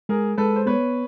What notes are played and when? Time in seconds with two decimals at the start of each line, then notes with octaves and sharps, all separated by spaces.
0.09 G#3 G#4 A#4
0.38 G#3 A4 B4
0.56 C5
0.66 B3 B4 C#5